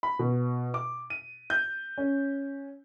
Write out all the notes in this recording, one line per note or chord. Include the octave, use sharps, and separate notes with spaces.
B5
B2
D6
D#7
G6
C#4